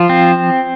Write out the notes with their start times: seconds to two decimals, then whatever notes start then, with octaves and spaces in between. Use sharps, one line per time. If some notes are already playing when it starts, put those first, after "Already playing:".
Already playing: F3 F4
0.09 C4